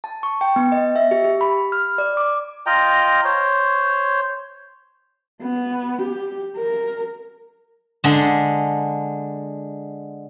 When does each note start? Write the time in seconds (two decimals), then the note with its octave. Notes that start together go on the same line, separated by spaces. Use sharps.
0.04 A5
0.23 C#6
0.41 G5
0.56 B3
0.72 D#5
0.96 E5
1.11 G4
1.24 G4
1.41 B5
1.72 F6
1.98 D5
2.17 D6
2.66 F4 D#5 G5 A#5
3.24 C5 C#5
5.42 B3
6.01 G4
6.57 A#4
8.04 D3 G#3